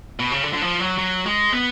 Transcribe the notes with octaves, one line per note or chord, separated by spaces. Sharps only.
B2
C#3
D3
D3
F3
F#3
F#3
G#3
B3